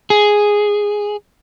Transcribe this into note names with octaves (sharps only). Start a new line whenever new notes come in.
G#4